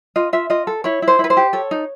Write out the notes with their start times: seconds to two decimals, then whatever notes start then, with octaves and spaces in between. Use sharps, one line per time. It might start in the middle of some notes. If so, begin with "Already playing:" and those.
0.16 F4 D#5
0.33 F4 E5
0.50 F4 D#5
0.67 A4
0.84 E4 C#5
1.02 E4
1.08 C5
1.19 E4
1.24 B4
1.30 C5
1.37 G4
1.53 A4 C#5
1.71 D#4